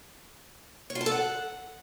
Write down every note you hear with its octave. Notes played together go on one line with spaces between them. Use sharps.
C#5
F4
A5
A4
F#5